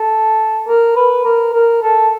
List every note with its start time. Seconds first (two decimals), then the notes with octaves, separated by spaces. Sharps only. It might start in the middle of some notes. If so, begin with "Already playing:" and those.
Already playing: A4
0.68 A#4
0.96 B4
1.25 A#4
1.53 A#4
1.82 A4